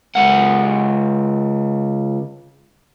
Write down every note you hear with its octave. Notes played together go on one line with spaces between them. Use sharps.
C#2 F#5